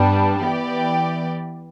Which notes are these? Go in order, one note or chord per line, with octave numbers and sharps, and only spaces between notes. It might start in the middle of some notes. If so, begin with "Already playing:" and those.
Already playing: G2 G3 B3 D4
E3 B3 G4 D5